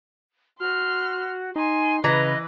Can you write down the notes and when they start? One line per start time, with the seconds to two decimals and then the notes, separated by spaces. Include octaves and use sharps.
0.60 F#4 C6 F6
1.56 D#4 G#5 C6
2.04 C#3 E3 B4 D#5 A#5